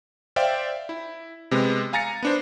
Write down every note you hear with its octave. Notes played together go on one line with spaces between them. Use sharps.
C5 D5 E5 F5 G5
E4
C3 G#3 B3
F5 G#5 A#5 A6 A#6 C#7
B3 D4 C5